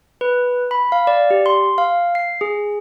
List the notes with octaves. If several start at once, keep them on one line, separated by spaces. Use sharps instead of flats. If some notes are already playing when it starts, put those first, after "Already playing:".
B4
B5
F5
D5
G4
C6
F5
C7
G#4